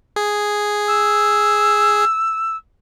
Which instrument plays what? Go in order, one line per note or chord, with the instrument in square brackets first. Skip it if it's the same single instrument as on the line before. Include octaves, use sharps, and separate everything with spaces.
[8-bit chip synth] G#4
[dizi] E6